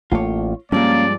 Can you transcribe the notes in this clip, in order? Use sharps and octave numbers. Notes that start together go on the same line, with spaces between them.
A1 A3 A#3 F4 C#5
G2 F3 G#3 A#3 C#4 D5